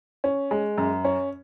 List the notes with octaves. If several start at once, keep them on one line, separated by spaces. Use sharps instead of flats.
C#4
G#3
F#2
C#4